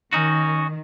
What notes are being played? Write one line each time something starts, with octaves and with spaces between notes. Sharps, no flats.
D#3 C#4 D#4 F#4